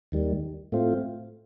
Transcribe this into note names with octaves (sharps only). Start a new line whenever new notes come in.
D#2 D#3 G3
A2 A3 C4 F4